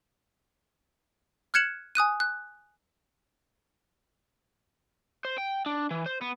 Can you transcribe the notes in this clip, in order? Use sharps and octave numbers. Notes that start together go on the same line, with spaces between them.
F6 F#6 G#6 C#7 E7 F#7
G#5 D#6 F#6 D#7
F#6
C5
G5
D4
E3
C5
B3